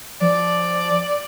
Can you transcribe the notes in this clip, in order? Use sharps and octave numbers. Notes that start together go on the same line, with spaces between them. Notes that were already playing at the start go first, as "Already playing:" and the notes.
F3 D5